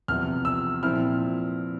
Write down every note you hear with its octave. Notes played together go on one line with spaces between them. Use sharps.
E2 C3 F3 F6
E6
A#2 F3 C4 E4 F6